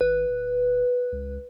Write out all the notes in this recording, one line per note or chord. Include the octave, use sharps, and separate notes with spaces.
G#1 B4
D1
C#2